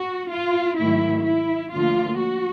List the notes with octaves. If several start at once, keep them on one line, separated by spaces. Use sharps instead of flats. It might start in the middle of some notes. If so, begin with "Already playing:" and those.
Already playing: F#4
F4
G#2 D#3 F#3 A3 E4
E4
D2 D3 F3 A#3 F4
F#4